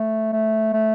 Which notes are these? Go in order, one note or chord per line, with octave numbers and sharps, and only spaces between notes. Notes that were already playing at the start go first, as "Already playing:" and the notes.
Already playing: A3
A3
A3